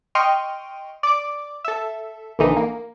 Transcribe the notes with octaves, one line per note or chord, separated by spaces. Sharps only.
D#5 G5 C6 C#6 F6
D5 D6
A4 E5
A#1 D3 E3 D#4
A#3